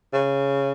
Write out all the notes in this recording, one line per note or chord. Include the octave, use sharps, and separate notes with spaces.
C#3